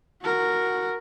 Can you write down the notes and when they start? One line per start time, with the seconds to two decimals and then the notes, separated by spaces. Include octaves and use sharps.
0.22 F#4 A#4